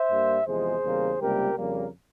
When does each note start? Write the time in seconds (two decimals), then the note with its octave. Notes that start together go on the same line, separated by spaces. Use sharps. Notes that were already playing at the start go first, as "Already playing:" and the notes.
Already playing: C5 E5
0.08 G2 G3 A#3
0.46 E2 C3 F3 G#3 G#4 C5
0.83 E2 C#3 G3 A#3
1.20 C#2 C3 G3 A#3 G4 A#4
1.57 F2 C#3 G3 A#3